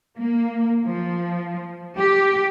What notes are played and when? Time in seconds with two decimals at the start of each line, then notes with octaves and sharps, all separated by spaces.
0.17 A#3
0.85 F3
1.97 G4